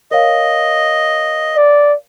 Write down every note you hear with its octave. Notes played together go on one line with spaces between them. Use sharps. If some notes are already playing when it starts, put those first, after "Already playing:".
A#4 C#5 D#5 F5
D5